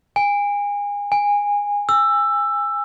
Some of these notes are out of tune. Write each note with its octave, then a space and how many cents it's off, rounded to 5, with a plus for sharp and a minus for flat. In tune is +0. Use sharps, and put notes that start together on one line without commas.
G#5 -30
G#5 -20
E6 +10